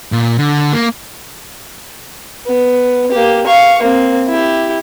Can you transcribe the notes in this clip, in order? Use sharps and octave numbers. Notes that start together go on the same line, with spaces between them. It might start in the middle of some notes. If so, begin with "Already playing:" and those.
A#2
D3
A#3
B3
A#3 G4
F5 C#6
A#3 C4
E4 G4